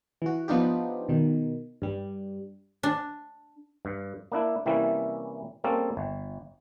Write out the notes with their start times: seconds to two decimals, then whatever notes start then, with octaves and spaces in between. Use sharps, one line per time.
0.22 E3 F#4
0.48 F3 B3 D4 D#4 F4 G4
1.08 B2 D#3
1.82 G2 G3
2.83 D4
3.85 G2
4.32 A#3 D4 E4
4.65 C3 E3 G3 A#3 C#4 E4
5.64 G3 A#3 C4 C#4 G#4 A4
5.97 G1